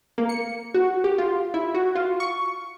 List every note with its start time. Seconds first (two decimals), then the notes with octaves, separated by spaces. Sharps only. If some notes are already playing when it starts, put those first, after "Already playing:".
0.18 A#3
0.29 C#7
0.74 F#4
1.04 G4
1.18 F4
1.54 E4
1.74 F#4
1.95 F4
2.20 C#6